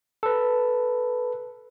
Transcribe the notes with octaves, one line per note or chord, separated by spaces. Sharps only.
A4 B4